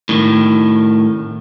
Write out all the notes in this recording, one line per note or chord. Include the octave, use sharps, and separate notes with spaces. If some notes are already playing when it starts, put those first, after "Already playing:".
A2 D#3